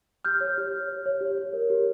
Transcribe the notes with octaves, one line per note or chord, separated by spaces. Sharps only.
G4 F6 G6
C#5
G4
C#5
C#5
C#5
G4
C#5
A#4
G4